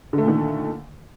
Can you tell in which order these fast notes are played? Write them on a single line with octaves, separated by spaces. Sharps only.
D3 A3 A#2 D#3